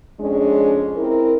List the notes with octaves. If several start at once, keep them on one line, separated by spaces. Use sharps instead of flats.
F2 G#3 C#4 D4 G#4
C4 E4 A#4